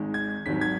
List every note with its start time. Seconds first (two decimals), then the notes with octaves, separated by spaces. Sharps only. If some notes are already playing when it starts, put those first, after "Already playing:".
Already playing: G#1 G#2 G#3
0.14 G#6
0.46 G#1 G#2 D#3 F#3 B6
0.61 G#6